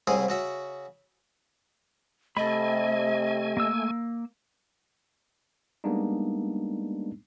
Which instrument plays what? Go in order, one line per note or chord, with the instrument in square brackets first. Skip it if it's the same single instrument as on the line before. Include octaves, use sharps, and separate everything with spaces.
[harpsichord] C2 G#2 C#3 E4 G#4
C#3 F#4 E5
[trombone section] C3 [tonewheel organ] A3 G#5 [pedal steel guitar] A4 B5 [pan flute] D#5
[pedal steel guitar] A#3 E6
[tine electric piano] G3 G#3 A#3 B3 D4 D#4